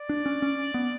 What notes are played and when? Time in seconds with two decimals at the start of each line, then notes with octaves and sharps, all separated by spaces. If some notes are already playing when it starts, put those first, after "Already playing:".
Already playing: D5
0.09 D4
0.26 C#4
0.42 C#4
0.74 B3